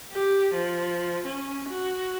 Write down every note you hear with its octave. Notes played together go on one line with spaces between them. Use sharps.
G4
F3
C#4
F#4